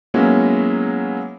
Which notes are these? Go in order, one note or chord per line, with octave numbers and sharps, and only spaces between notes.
F#3 G#3 A#3 B3 C#4 E4